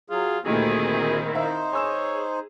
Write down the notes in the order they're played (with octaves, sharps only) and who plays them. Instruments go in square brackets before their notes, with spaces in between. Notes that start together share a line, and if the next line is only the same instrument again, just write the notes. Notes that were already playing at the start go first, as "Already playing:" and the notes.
[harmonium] F#3 G#4 [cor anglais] F4
[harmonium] D2 [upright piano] A#2 A3 G4 [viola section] D#3 C4 E4 [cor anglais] G#4
[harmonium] D#4 C5 [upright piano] E5 F5
[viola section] G#4 [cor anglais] C#5 [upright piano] G#5 E6 E7